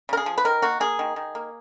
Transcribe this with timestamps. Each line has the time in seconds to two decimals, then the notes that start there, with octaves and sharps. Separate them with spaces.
0.09 C#3 A#4
0.17 G#4
0.26 F3
0.38 B4
0.45 D#3 A#4
0.62 A#3 F#4
0.80 A#3 G#4
0.99 D#3
1.16 D#3
1.35 A#3